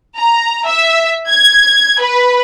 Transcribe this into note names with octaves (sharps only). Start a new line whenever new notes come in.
A#5
E5
G#6
B4